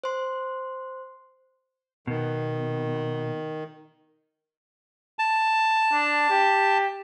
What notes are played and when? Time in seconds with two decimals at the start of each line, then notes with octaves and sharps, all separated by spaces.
0.04 C5 C6
2.07 B2 D#3
5.19 A5
5.93 D4
6.30 G4